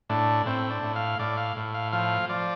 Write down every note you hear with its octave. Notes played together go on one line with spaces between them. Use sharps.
A2 D4
A2 C4
D4
A2
F5
A2 D5
F5
A2
F5
F3 F5
F3 D5